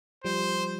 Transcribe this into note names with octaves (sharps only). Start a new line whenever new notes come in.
F3 G3 C5